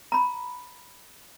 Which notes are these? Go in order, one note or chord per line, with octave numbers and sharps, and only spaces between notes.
A#5 B5